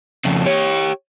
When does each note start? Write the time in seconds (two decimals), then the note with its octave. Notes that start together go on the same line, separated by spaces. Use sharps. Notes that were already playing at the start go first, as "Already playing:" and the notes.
0.25 F2 C#3
0.45 G4 C#5